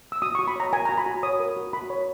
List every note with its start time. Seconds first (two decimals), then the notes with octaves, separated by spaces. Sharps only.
0.12 E6
0.22 F#4 D#6
0.35 C#6
0.39 F#4
0.48 B5
0.56 C#5 A#5
0.73 A#4 G#5
0.85 A#5
0.89 F#4
0.97 B5
1.06 F#4
1.23 C#5 D#6
1.40 A#4
1.57 F#4
1.73 F#4 B5
1.90 C#5